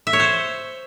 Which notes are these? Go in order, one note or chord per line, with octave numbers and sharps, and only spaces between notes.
E5
C#5
C5